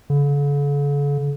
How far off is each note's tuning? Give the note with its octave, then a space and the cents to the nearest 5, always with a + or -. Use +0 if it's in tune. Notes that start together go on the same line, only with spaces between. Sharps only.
D3 -45